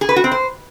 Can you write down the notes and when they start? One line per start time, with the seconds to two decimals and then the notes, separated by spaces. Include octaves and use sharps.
0.01 G#4
0.09 B4
0.16 F#4
0.24 C4
0.32 C5